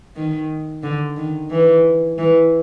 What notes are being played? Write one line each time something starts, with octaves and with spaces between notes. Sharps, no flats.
D#3
D3
D#3
E3
E3